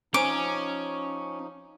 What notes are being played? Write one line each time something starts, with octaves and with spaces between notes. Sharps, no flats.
F3 C#4 D#4 C5 G#5 A#5 D6